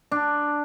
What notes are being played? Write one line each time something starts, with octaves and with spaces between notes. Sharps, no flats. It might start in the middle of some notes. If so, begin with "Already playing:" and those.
D4